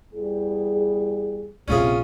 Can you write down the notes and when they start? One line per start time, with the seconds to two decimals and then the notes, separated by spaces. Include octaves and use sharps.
0.13 E2 G3 G#4
1.68 A#1 E2 C3 C#4 F4 G#4